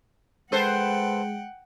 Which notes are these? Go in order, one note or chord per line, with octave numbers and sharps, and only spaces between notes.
G#3 A4 B4 C5 F#5 G5